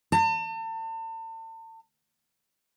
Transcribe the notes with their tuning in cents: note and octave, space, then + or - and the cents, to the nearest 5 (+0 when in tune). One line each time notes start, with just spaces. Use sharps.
A5 +40